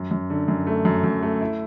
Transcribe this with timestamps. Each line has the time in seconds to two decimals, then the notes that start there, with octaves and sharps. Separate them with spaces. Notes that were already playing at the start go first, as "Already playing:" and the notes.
Already playing: F#2
0.11 F#2
0.30 D3
0.48 F#2
0.67 A3
0.85 F#2
1.04 F#2
1.23 A3
1.41 E4